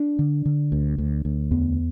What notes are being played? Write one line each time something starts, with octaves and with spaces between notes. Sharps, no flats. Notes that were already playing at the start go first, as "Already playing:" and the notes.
Already playing: D4
D3
D3
D2
D2
D2
E2 B3